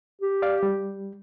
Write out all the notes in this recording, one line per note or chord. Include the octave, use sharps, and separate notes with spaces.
G4
D5 F5 D6
G3